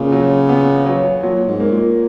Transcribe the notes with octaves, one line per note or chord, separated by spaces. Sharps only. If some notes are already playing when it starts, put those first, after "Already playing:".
Already playing: A#2 C#3
F#3
B3
F#3
A#2 F#3
G#2
A#3
A#2